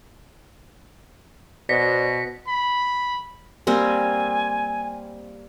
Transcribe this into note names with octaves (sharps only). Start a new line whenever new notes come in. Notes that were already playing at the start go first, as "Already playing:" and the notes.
B2 C5 D5 A#6 B6 C#7
B5
G3 A#3 C4 G#5